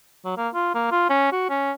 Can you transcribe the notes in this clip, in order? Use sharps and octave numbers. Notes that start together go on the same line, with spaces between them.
F#3
A#3
F4
A#3
F4
C#4
F#4
C#4